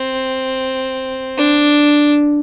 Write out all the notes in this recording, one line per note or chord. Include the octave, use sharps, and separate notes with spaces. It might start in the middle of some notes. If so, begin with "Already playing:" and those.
Already playing: C4
D4